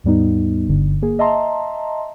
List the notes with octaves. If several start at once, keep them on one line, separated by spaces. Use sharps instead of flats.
D#2 G#2 G3 B3 D#4
G1 G2 D3
A#3 G#4
D#5 E5 A5 A#5 C6